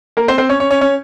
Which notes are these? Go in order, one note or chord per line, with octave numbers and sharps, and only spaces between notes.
A#3 A#4
C4 C5
C4 C5
C#4 C#5
C#4 C#5
C#4 C#5
C#4 C#5